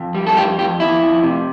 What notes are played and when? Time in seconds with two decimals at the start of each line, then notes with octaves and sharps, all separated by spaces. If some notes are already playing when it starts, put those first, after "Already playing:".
Already playing: F2
0.15 G3
0.27 A4
0.37 F2 G4
0.58 F2 G4
0.80 F2 E4
1.02 F2
1.23 C3